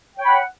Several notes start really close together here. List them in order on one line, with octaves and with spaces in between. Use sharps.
G5 C#5 B5 F#5